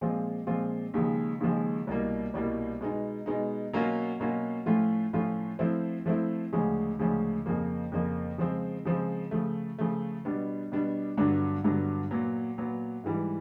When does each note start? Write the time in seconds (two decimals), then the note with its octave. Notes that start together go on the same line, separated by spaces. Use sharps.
0.01 A#2 F3 G#3 C4 F4
0.47 A#2 F3 G#3 C4 F4
0.94 D#2 C#3 F3 G#3
1.40 D#2 C#3 F3 G#3
1.87 C2 B2 G3 A#3
2.34 C2 B2 G3 A#3
2.81 B2 G#3 B3 D#4
3.26 B2 G#3 B3 D#4
3.73 B2 F#3 A#3 C#4 F4
4.20 B2 F#3 A#3 C#4 F4
4.66 A2 F3 A3 C#4 F4
5.13 A2 F3 A3 C#4 F4
5.59 F3 A3 C4 E4
6.06 F3 A3 C4 E4
6.53 D2 C#3 F3 G#3 C#4
6.99 D2 C#3 F3 G#3 C#4
7.46 F2 C#3 F3 A#3
7.92 F2 C#3 F3 A#3
8.38 C#3 F3 G#3 C4
8.85 C#3 F3 G#3 C4
9.31 C#3 F3 A3
9.79 C#3 F3 A3
10.25 B2 G3 B3 D4
10.72 B2 G3 B3 D4
11.17 G2 D3 F#3 B3 D4
11.64 G2 D3 F#3 B3 D4
12.11 A#2 F#3 B3
12.58 A#2 F#3 B3
13.04 G#2 E3 G3